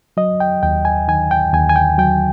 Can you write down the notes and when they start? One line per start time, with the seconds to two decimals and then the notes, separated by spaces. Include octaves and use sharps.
0.17 F#3 D#5
0.40 G5
0.63 D#2 G5
0.85 G#5
1.08 D#3 G#5
1.31 G5
1.53 D#2 G#5
1.70 G#5
1.76 G5
1.98 F#3 G5